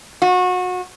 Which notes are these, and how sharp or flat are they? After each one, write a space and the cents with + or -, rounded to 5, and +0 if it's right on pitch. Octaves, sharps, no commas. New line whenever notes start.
F#4 -30